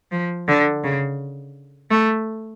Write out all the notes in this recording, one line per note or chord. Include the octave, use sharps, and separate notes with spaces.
F3
D3
C#3
A3